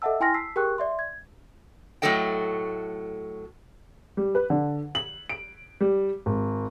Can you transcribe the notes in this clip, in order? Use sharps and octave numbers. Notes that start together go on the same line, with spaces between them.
A4 D#5 E5 F#5 A5 E6
E4 G5 G#5 C6 F6 A#6
A5 E6 B6 C7
G4 G#4 A#4 G5 C#6 F#6
D5 E5 C6
G#6
A2 F#3 A3 A4 D#5 G5
G3
B4
D3
F#7
D7
G3
G#1